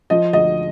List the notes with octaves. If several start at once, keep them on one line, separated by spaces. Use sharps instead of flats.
F3 D#5
D2 D#5